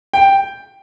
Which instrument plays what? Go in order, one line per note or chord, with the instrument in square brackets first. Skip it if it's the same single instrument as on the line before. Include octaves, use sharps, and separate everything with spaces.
[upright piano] G5